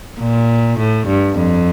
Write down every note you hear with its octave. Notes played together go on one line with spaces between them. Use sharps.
A#2
A2
G2
F2